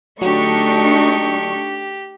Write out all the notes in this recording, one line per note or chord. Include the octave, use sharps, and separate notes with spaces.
D3 F#3 A3 D4 D#4 G4 C#6